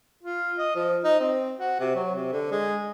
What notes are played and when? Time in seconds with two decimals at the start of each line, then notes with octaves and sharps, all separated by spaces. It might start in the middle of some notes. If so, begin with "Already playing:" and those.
0.23 F4
0.58 D#5
0.75 F3
1.04 D#4
1.20 C4
1.59 F#4
1.80 C3
1.95 F#3
2.15 C3
2.32 D3
2.52 G#3